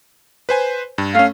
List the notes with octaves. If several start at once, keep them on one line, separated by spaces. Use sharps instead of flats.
B4 C5 G#5
G2
A3 C#4 F5